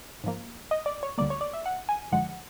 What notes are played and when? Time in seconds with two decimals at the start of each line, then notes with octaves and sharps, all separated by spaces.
0.24 G#2 F3 A#3
0.71 D#5
0.86 D5
1.03 C#5
1.18 D2 D3 G3 A#3 D5
1.30 C#5
1.41 D5
1.53 E5
1.66 F#5
1.89 G#5
2.12 G#1 F#2 D3 F3 G#3 F#5